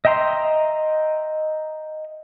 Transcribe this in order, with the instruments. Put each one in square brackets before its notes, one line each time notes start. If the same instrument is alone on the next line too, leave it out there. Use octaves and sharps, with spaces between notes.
[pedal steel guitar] D#5 E5 G5 A#5 C6